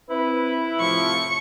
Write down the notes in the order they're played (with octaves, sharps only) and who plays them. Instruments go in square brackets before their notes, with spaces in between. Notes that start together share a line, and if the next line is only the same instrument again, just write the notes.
[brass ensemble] C4 B4 [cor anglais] E4
[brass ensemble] A2 C3 F3 [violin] C#6